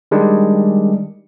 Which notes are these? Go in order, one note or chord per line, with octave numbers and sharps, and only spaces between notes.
D#3 G3 G#3 D4